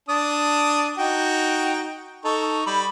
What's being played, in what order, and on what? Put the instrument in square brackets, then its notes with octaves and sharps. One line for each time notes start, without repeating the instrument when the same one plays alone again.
[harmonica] D4 A5 D#6
D#4 F#4 G5
D#4 A4 C#6
G3 B5